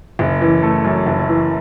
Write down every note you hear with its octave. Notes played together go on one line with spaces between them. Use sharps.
F#1
E3
A3
F#2
F#1
E3